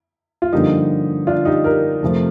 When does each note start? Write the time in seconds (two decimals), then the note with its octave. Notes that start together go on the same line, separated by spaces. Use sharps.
0.42 F4
0.52 G2 D3 F3 A#3 D#4 G4
1.27 D4 F4
1.45 D#4 G4
1.64 G4 A#4
2.02 F2 C3 F3 A3